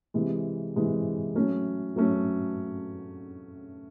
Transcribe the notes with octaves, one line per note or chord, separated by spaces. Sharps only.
C3 E3 G#3
C3 E3 G#3
F#3 A3 C#4
F#3 A3 C#4